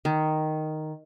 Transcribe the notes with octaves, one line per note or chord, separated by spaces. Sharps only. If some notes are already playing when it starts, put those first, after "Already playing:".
D#3